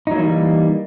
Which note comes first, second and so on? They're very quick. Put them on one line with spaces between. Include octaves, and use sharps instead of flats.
D#4 F#3 A#3 E3 G3